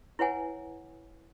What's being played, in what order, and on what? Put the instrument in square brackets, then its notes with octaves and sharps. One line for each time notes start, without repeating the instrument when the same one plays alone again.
[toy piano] E4 B4 C#5 F#5 G#5